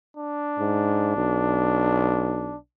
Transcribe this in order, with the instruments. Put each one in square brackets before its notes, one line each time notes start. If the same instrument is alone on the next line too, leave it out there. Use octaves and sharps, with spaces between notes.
[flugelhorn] D4
[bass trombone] G#2
B1